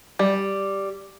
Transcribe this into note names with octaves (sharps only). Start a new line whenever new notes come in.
G3